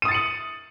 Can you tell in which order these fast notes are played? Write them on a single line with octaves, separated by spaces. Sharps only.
D#7 D#6 A6 C#7 F#7